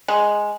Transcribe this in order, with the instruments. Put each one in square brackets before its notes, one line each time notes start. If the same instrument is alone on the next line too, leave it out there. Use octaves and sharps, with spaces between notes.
[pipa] G#3